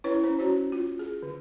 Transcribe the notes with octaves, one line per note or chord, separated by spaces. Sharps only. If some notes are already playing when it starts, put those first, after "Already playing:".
C#4 E4 B4 C#5
C#4 C5
C#4 F#4 C#5
F4
G#4
D3